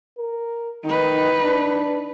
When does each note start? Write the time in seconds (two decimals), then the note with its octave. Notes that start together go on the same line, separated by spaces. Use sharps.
0.18 A#4
0.85 D#3 D#4 B4
1.42 D4